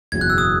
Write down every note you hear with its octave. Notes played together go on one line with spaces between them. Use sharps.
F#1 E2 B2 G#6
F#6
E6
D#6